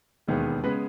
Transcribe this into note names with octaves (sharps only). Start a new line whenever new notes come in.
E1 D#2 D#3 G#3 B3
C#3 G#3 B3 B4